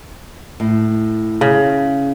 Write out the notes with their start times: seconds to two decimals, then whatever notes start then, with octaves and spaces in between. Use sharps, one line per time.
0.60 A2
1.41 C#3